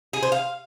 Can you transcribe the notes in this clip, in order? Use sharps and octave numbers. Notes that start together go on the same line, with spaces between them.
G#4
C5
F5